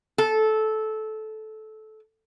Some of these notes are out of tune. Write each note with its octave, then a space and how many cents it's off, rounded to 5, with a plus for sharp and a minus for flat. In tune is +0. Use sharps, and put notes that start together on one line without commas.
A4 -15